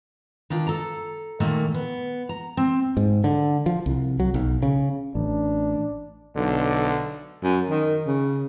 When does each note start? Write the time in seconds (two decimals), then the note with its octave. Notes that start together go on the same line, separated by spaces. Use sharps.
0.50 D#3 D4 F4
0.67 A4 A#5
1.40 A#2 D#3 A3 A#3 D#4
1.74 B3
2.29 A#5
2.57 C4
2.97 G#2
3.24 D3
3.66 F3
3.86 C2
4.20 F#3
4.34 B1
4.62 C#3
5.15 A1 D4
6.36 B1 D3
7.43 F#2
7.69 D#3
8.06 C#3